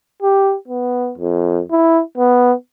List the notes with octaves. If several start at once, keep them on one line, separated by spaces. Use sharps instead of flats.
G4
B3
F2
E4
B3